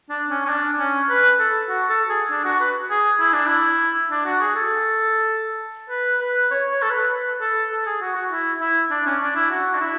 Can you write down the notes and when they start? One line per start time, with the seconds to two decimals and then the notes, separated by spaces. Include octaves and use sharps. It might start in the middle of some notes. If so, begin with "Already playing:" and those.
0.09 D4
0.30 C#4
0.45 C#4
0.49 D4
0.79 C#4
1.09 B4
1.39 A4
1.70 F#4
1.89 A4
2.09 G#4
2.30 D4
2.45 F#4
2.60 B4
2.90 G#4
3.20 E4
3.33 D4
3.46 E4
4.11 D4
4.25 F#4
4.41 G#4
4.56 A4
5.90 B4
6.20 B4
6.51 C#5
6.71 C#5
6.82 A4
6.90 B4
7.10 B4
7.41 A4
7.71 A4
7.86 G#4
8.01 F#4
8.15 F#4
8.31 E4
8.61 E4
8.91 D4
9.06 C#4
9.22 D4
9.36 E4
9.51 F#4
9.75 D4
9.81 E4